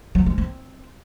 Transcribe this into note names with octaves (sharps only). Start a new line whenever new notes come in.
F#3
G#3
C4